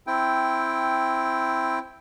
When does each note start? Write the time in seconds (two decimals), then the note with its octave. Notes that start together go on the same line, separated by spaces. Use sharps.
0.07 C4 E4 G5